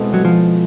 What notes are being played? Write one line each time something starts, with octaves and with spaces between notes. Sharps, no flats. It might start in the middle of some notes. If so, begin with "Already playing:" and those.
Already playing: B2 G#3 C4 E4 A4
F#3
F3